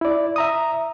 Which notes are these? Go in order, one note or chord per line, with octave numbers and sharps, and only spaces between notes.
E4 D5
E5 A#5 D#6